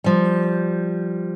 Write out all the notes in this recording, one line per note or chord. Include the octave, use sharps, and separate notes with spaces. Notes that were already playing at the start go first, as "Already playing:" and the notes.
F3 G3